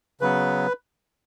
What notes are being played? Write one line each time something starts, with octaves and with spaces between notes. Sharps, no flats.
C#3 F#3 B3 B4